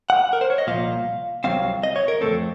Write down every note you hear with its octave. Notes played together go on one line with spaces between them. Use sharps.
F#5
A#4
C5
C#5
D#5
C2 A#2 F3 F5
C2 C3 F#3 C4 F5
D#5
C#5
A#4
C#3 A3 C4 A4
F2